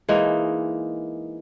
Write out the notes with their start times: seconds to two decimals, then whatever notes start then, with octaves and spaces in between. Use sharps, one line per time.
0.08 E3 G#3 A#3 D#4